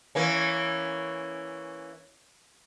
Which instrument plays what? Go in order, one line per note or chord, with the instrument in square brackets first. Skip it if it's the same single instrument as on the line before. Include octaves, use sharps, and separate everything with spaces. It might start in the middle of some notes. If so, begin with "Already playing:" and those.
[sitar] E3 A#3 C#4